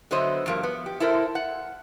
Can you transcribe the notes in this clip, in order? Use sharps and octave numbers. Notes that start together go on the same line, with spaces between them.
D3 F#3 B3 C5 D#5 E5
G2 F3 A#3
B3
G4
E4 A4 A#4 C5
F#5